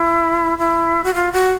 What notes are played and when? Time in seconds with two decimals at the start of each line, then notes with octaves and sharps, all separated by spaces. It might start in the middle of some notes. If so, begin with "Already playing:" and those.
Already playing: E4
0.58 E4
1.04 F#4
1.14 F4
1.32 F#4